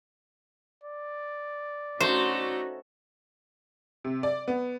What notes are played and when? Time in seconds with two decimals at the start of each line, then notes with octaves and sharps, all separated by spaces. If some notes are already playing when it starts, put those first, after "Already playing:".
0.84 D5
2.00 A3 C#4 D#4 F#4 C5
4.04 C3
4.23 D5
4.48 B3